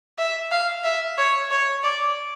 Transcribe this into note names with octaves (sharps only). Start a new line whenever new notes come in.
E5
F5
E5
C#5
C#5
D5